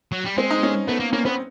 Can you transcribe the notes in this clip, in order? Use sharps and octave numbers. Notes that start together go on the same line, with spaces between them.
F#3
G3
G#3 C4
D#4
C#4
A3 B3
A#3
A#3 C#4
B3 C4